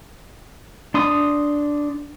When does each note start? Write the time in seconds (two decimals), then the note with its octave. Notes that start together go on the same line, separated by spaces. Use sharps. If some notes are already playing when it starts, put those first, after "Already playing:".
0.94 D4 C6 D#6